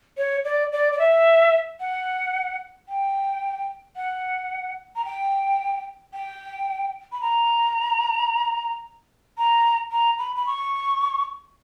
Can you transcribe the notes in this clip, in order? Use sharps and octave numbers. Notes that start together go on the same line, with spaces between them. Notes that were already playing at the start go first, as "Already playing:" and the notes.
C#5
D5
D5
D5
E5
F#5
G5
F#5
A#5
G5
G5
B5
A#5
A#5
A#5
B5
B5
C#6